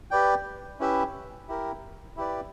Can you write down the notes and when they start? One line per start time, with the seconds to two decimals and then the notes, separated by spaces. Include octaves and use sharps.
0.11 G4 B4 D5 G5
0.80 C#4 E4 G4 B4 E5
1.49 E4 G4 A#4
2.17 E4 G4 B4 D5